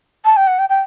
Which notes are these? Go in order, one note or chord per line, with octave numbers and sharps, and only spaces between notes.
A5
G5
F#5
G5
G5